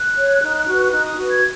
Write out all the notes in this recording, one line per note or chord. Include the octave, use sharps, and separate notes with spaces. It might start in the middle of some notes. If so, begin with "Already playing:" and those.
Already playing: F#6
C#5
D#4
F#4 B4
D#4 F#6
D#6
F#4 B4
G#6